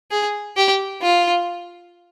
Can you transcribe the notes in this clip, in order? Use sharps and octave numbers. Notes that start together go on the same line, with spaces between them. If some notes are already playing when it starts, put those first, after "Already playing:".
G#4
G4
F4